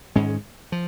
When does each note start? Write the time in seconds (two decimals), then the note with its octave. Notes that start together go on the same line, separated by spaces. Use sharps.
0.15 G#2 D#3 G#3 C#4
0.72 F3